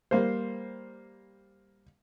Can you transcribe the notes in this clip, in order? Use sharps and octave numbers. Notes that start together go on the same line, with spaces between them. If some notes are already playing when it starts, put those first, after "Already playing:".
G3 A#3 C5